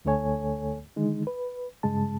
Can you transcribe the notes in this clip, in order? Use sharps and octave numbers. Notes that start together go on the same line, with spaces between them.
D2 D3 A3 A4 C#5 G#5
D3 D#3 G#3 D#4
B4
G2 C#3 G#3 A5